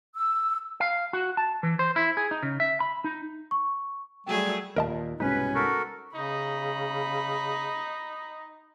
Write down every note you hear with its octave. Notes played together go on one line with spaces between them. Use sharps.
E6
F5
F#4
A5
E3
C5
E4
G#4
D#4
C#3
E5
B5
D#4
C#6
F#3 G3 A3 G#4 G5
D#2 A#2 A#4 D#5 A5
C2 G#2 B2 C#4 D#4 B4
F#4 A4 A#4
C#3 D#4 B5